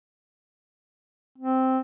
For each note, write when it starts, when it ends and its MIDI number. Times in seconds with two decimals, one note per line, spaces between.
1.39 1.80 60